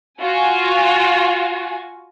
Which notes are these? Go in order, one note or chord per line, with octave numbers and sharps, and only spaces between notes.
F4 F#4 G#5